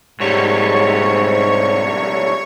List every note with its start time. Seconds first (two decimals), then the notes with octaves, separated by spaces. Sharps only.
0.20 B1 G#2 G3 C#5 C#6